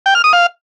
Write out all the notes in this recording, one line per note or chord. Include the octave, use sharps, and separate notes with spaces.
G5
F6
D#6
F5